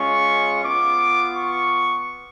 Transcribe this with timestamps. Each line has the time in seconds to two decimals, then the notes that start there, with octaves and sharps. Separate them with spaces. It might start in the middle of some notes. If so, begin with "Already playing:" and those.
Already playing: G#3 C#4 F4 C#6
0.64 B3 F4 D6
1.35 C#6